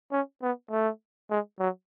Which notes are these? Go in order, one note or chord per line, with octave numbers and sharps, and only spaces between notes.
C#4
B3
A3
G#3
F#3